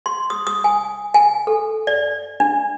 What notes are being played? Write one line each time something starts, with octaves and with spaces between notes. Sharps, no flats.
C6
D#6
D#6
G#5
G#5
A4
D5
D4